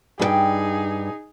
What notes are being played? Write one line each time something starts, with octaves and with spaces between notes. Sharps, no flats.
G2 D#4 G#4 A4 G5